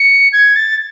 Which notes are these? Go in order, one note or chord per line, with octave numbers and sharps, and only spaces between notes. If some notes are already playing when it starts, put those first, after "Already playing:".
Already playing: C#7
G#6
A6